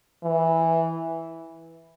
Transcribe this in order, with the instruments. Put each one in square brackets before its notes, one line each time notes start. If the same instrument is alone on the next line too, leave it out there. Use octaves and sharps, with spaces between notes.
[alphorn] E3